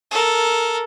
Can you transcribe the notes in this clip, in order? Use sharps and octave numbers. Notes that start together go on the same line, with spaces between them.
A4 A#4